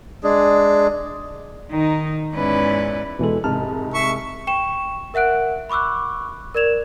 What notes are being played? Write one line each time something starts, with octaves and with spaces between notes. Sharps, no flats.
G#3 D4 G#4
D#3 D#4
E2 G#2 C#4 E4 B4 D5
D#2 B2 E3 G#3 A4
C2 G#2 A5 F6
E5 C#6
G5 C#6 E7
A#4 E5 F#5 F#6 D7
B5 C#6 D6 E6 F#6
A#4 D5 G#6 E7 F7